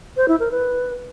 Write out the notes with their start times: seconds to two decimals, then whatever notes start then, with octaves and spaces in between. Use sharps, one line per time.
0.17 C5
0.28 E4
0.40 A#4
0.51 B4